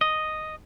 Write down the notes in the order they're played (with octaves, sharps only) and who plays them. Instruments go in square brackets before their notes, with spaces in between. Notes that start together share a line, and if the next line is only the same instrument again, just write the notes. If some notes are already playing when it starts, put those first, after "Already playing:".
[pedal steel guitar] D#5